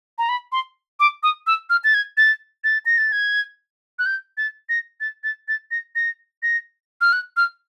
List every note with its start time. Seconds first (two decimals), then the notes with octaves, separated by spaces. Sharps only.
0.18 A#5
0.29 B5
0.52 C6
1.00 D6
1.23 D#6
1.47 E6
1.70 F6
1.84 A6
1.94 G#6
2.17 A6
2.64 A6
2.86 A#6
2.98 A6
3.12 G#6
3.99 F#6
4.06 G6
4.37 A6
4.69 A#6
5.00 A6
5.24 A6
5.48 A6
5.71 A#6
5.95 A#6
6.43 A#6
7.01 F6
7.13 F#6
7.37 F6